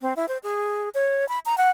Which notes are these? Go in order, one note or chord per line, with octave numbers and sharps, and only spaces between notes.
C4
E4
C5
G#4
C#5
B5
A#5
F#5